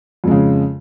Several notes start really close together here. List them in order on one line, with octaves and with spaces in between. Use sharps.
F2 G#3 C#3